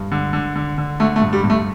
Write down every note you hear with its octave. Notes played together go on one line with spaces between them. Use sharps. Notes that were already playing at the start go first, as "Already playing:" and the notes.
Already playing: G2
D3
D3
D3
D3
D3 A3
A3
G2
G3
G2
A3